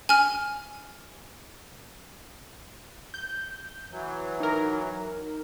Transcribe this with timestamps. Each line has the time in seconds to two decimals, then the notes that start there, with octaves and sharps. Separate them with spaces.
0.09 G#5 F6
3.14 G6
3.90 E3 F#3
4.40 D#4 A#4